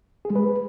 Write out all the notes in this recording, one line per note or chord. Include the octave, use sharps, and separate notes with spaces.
G#4
G#3
B4